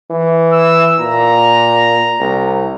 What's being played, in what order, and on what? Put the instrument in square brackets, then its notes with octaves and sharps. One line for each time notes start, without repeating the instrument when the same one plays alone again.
[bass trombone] E3
[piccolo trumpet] E6
[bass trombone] A#2 [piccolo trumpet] A#5
[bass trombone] C2